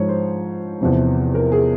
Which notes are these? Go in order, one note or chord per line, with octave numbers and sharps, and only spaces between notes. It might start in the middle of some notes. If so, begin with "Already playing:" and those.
Already playing: G#2 F3 C#5
C5
E2 C3 F3
A#4
G#4